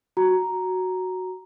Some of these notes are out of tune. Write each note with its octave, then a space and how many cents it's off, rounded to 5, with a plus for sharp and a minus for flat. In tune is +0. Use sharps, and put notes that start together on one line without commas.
F#4 +0 A#5 +0